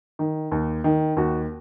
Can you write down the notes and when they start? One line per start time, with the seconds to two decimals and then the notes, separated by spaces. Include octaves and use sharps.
0.19 D#3
0.52 D#2
0.84 D#3
1.17 D#2 F#4